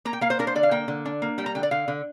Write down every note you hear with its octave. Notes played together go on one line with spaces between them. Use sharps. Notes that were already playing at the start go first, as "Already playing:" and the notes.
A#3 A#5
G5
A#3 F5
C5
D4 A#4
C5
D3 D5
F5
A#3 G5
D3
D4
A#3
G3 G5
A#5
D3 G5
D5
D3 F5
D3